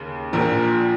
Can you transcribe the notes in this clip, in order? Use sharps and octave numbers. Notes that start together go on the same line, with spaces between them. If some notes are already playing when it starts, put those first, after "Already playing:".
Already playing: D#2 C#3
A#1 A#2 F3 A#4